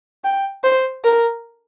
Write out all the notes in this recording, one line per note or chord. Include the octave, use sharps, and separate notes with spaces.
G5
C5
A#4